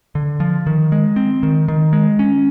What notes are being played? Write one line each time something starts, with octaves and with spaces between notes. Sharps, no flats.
D3
F3
D#3
G#3
C4
D#3
D#3
G#3
C#4